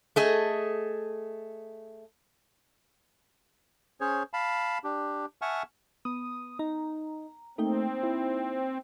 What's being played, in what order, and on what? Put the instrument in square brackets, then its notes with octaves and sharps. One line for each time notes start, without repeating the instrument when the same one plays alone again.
[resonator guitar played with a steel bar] A3 G#4 D#5
[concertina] C#4 G#4 C5 C#5
F5 A5 B5
D4 G4
E5 F#5 G#5 A5 C#6 F6
[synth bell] B3 [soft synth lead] D#6
[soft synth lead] D#4 [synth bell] A#5
[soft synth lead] A3 [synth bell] A#3 D#4 G5 [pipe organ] C4
[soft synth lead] E4